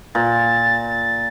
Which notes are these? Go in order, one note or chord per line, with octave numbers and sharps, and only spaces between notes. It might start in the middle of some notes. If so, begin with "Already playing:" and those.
A#2 A6